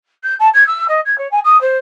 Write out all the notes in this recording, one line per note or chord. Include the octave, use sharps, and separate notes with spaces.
G6
A5
G#6
E6
D#5
G#6
C#5
G#5
D#6
C5